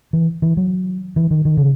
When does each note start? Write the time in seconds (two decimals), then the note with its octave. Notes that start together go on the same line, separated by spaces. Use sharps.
0.13 E3
0.42 E3
0.57 F#3
1.16 E3
1.31 D#3
1.45 D#3
1.57 C#3